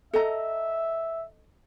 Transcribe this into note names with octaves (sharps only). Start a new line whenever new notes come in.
A4 D#5 E5 A#5